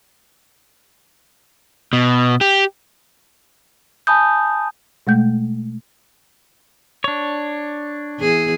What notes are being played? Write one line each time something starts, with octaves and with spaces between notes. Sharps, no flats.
B2
G4
G#5 A5 B5 D#6 G6
B2 G#3 A3 G6
D4 C#5
E2 G#4